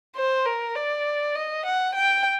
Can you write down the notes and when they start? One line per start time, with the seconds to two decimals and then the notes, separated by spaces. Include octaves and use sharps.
0.16 C5
0.45 A#4
0.75 D5
1.35 D#5
1.66 F#5
1.95 G5